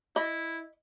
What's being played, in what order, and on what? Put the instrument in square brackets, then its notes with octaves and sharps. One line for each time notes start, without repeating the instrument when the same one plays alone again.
[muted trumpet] E4 [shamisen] D#5 B5